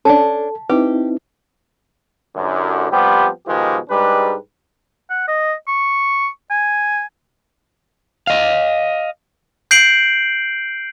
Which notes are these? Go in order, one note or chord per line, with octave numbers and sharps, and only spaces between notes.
C#4 D4 A4 A5
C4 D#4 E4 G4 B4
A1 F#2 D3
F3 G3 B3 C4 G4
B2 D#3 F3 G#3 G4
G#2 G3 G#3 D4 G4 B4
F#5
D#5
C#6
G#5
D#5 F5
G6 C7 D7 F#7